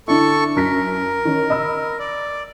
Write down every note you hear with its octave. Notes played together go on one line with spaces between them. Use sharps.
D3 D4 E4 A4 C#6
F#2 A#4 B6
D#3 C#4
D#5 B5 E6
D5